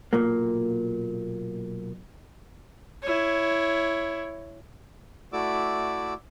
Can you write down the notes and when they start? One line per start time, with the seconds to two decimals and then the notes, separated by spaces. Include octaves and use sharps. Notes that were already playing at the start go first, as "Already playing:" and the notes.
0.13 B1 A#2 A#3
3.03 E4 C#5
5.33 A3 E4 F#4 D5 D6 E6